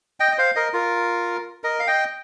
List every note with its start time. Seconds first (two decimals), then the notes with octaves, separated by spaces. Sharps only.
0.20 D#5 G5
0.32 D#5
0.38 C5 F5
0.55 A#4 D#5
0.73 F4 A#4
1.64 A#4 D#5
1.80 F5
1.87 D#5 G5